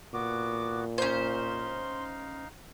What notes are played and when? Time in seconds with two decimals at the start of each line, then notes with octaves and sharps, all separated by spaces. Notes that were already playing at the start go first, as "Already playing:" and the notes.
0.13 A#2 B3 F#4 D6
0.98 C#4 D#4 C5 F5 C6